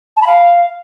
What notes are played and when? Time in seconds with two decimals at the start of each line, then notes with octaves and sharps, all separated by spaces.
0.16 A5
0.21 B5
0.26 F5